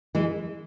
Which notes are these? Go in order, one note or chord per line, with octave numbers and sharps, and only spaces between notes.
E3 G#3